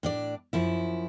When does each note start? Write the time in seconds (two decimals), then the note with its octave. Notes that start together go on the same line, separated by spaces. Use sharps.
0.03 A2 D4 D5
0.53 F#2 F3 E4